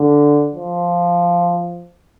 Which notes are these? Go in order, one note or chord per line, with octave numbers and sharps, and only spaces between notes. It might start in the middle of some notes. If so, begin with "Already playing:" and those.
Already playing: D3
F3